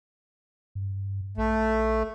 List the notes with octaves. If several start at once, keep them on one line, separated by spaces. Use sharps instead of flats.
G2
A#1 A3